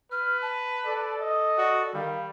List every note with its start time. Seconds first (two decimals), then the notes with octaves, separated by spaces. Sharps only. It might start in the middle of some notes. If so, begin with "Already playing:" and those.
0.12 B4 F6
0.42 A5
0.86 A4 D5
1.21 D#5
1.58 F#4 D5
1.94 D#3 G3 F5